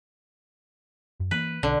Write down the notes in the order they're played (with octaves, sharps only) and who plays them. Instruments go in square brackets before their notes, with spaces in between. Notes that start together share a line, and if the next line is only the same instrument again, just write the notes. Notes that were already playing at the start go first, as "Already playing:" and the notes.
[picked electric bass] F#2
[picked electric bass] E3 A#3 [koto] B4
[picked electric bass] B1 [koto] D3